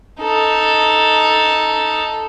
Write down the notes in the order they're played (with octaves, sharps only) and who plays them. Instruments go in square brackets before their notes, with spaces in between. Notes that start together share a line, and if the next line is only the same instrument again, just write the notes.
[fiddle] D#4 A4